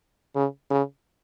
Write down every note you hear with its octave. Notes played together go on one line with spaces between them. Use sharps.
C#3
C#3